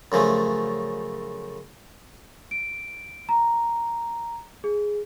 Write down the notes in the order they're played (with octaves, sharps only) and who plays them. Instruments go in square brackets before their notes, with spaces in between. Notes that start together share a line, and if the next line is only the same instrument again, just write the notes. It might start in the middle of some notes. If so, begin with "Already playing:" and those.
[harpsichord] F#2 C#3 F3 A3
[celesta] D7
A#5
G#4